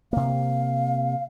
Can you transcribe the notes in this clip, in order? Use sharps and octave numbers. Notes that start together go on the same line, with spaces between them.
C3 A#3 F5